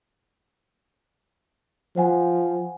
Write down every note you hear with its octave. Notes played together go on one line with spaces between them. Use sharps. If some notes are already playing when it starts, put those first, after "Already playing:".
F3 C5 F#5 G#5